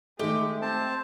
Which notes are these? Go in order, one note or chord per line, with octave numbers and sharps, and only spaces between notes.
D#3 G#3 A3 G4
C4 C5 A5